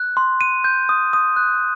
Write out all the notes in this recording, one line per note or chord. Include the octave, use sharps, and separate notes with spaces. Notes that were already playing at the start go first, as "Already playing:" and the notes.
Already playing: F#6
C6
D#7
G6
D#6
D#6
F#6